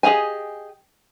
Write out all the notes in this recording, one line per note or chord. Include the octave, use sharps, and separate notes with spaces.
G4 G#4 D#5 F5 G#5